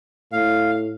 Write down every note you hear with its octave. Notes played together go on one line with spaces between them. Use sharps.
A2 F5